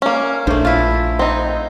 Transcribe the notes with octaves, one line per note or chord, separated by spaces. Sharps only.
A#3 C#4
A#1 A3 D4 C5
E4 F4
C4 D#4